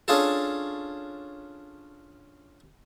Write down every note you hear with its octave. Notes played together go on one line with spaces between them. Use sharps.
C#4 D4 F4 G#4 A4